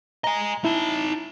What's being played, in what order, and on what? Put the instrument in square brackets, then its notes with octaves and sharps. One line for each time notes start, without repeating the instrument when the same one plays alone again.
[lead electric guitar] D#5 G#5 [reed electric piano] A#5
[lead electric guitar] D#4 A5 [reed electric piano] E4